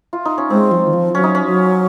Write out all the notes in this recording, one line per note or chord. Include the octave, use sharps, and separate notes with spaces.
F4
D#4
C#4
G#3 C4
F3
D#3
F3
F#3 C#4
D#4
C#4
F#3